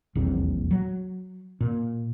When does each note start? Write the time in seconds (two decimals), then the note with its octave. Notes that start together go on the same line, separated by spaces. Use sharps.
0.15 D#1 A#1 E2 C3
0.71 F#3
1.61 A#2